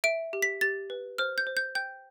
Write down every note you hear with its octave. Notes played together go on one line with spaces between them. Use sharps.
E5 D7
G4
B6
G4 A6
B4
C5 F6
G6
C5
G6
G5 G6